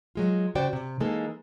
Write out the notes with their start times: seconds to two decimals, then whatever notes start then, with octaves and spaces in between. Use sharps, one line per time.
0.15 F#3 G#3 F4
0.55 C#3 F#4 C5 D5 G5
0.73 C3
1.00 E3 G#3 A#3 D#4 A4